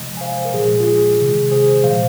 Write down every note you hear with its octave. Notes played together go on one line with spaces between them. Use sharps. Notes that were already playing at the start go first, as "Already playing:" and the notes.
Already playing: C3 F3 G#3 D#5
G#5
C5 F5
A#4
A#2 F3 G#3 G#4
F4
G#4
C3 D#3 G#3
G#4 C5
A#2 F3 G#3 C5 F5